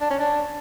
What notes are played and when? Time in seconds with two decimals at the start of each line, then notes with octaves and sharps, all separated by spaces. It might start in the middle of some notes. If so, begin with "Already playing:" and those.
0.01 D4
0.10 C#4
0.20 D4